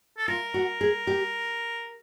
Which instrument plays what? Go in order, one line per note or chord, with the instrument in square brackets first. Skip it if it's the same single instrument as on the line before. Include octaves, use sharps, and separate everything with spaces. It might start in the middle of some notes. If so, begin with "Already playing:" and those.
[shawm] A4
[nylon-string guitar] F4 [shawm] A#4
[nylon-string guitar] F#4
G#4
G4